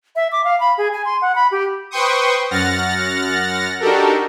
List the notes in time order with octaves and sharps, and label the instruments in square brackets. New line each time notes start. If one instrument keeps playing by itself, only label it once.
[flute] E5
D6
F5
B5
G#4
G#5
C6
F#5
B5
G4
[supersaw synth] B4 C5 G5 C6 C#6 D#6
F#2 F#5 F6 A6 A#6
D4 D#4 F#4 G4 A4 A#4